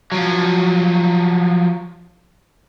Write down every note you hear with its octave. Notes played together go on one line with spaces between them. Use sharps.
F3 F#3